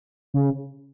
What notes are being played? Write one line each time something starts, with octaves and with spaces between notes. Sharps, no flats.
C#3